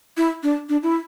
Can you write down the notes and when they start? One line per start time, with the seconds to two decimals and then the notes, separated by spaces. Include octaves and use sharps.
0.17 E4
0.43 D4
0.69 D4
0.83 E4